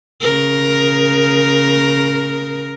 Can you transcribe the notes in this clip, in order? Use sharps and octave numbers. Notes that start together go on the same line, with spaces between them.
C#3 A#4